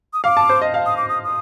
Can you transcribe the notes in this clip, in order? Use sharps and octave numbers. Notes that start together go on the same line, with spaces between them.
D#6
F5 D6
A5
C5
D#5
F5
D#6
D6
D#6
D#6